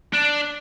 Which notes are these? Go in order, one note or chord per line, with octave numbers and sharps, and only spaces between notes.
D4